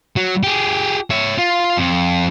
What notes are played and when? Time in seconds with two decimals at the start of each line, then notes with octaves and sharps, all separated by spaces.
0.16 F#3
0.43 G4 G#4
1.10 C#5 E5
1.38 F4
1.77 F2